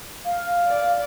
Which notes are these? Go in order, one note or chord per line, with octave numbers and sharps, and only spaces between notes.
F5
D5